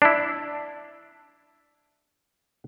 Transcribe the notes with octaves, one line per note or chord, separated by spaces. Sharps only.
D4 E4